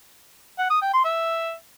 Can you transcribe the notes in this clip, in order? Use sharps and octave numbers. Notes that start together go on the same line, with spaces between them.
F#5
D#6
G5
C6
E5